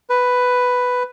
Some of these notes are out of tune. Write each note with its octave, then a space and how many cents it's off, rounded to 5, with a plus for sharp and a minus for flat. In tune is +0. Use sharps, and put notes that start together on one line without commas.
B4 +5